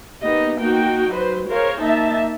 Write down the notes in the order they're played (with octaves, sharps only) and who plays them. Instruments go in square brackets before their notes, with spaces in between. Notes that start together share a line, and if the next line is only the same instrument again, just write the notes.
[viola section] A#3 B3 D#4 G4 D#5
A#3 D#4 F#4 G5
F#3 B4 C5
G#4 A#4 C5 C#5 F5
A#3 D#4 E5 A5